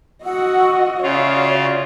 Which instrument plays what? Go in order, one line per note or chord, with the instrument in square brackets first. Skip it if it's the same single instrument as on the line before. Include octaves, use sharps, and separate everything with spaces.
[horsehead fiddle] F#4 D#5 [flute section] F#5 E6
[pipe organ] C#3 F4 [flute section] F#4 D5 E5 [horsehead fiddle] C#5